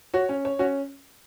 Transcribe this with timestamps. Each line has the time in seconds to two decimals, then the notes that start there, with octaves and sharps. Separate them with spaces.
0.14 F#4 C#5
0.29 C#4
0.45 C#5
0.59 C#4 F#4